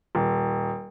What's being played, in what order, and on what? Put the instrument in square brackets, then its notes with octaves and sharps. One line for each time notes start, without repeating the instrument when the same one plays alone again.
[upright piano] D#1